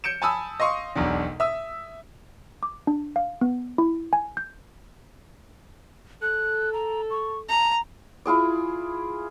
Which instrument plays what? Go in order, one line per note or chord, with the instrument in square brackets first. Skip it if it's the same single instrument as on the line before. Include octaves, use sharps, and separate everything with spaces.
[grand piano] G6 C#7 D7 E7
G#5 A5 B5 D#6 E6
D#5 F5 C6 C#6 D#6
E1 B1 E2 B2 D4
E5 D#6 E6
[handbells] D6
D4
F5
B3
E4
G#5
G6
[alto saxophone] A4 [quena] F#6
[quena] A#5
C#6
[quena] A5 [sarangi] A#5
[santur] E4 F4 G#4 D5